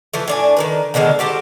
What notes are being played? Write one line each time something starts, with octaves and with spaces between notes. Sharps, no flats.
E3 F3 A3
A2 D4 G#5
D#3 E3 B4
B2 D3 D#3 G#3
F#4 G4 A4 C5